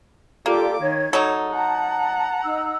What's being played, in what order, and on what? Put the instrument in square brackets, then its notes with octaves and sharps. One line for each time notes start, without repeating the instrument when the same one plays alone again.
[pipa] A#3 [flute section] F4 A4 D5 [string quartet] G4 D6
[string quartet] D#3 [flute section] C#5 G#6
[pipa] F#3 D#4 [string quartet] A4
[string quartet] F#5 A#5 [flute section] A5
[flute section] D#4 E6